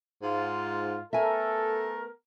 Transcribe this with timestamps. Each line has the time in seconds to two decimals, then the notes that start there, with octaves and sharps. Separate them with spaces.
0.23 G#2 F4
1.13 A3 B3 A4 A#4 E5 G#5